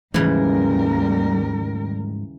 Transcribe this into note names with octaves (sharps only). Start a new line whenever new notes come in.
D#2 G#2 C#3 E3 F3 G3 A3 A#4